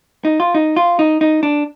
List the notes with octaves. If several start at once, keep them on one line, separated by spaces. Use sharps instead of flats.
D#4
F4
D#4
F4
D#4
D#4
D4